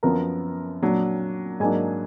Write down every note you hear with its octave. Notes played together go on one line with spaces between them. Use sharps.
F#2 F3 B3 A#4 A#5
A#2 F#3 D4
G#2 F#3 A#3 D4 G#4 G#5